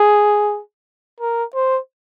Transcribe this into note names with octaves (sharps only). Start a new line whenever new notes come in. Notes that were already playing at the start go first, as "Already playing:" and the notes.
Already playing: G#4
A#4
C5